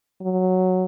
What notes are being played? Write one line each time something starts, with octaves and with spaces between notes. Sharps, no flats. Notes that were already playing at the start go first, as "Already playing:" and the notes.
F#3